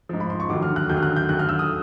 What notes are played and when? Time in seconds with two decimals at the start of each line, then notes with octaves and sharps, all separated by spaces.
0.09 G#2 F3
0.20 B5
0.30 C6
0.40 C#6
0.49 D#2 D3 F#3 D6
0.62 F6
0.76 F#6
0.89 D#2 D3 F#3 G6
0.97 F6
1.03 F#6
1.16 G6
1.29 D#2 D3 F#3 F#6
1.39 F6
1.49 E6
1.59 D#6